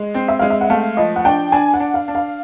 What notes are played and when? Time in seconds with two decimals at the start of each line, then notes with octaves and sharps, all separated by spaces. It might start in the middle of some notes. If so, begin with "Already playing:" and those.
Already playing: G#3
0.14 C4
0.28 E5
0.39 G#3 F5
0.50 E5
0.61 F#5
0.70 A3 F5
0.97 F3 D#5
1.16 F#5
1.25 D4 G5
1.52 D4 G#5
1.74 F#5
1.80 D4
1.94 F5
2.08 D4
2.15 F5